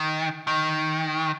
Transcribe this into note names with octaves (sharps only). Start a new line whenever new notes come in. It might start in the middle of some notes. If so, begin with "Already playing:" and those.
Already playing: D#3
D#3